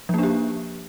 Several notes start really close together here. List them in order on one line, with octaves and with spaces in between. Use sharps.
F3 A#3 D4 G4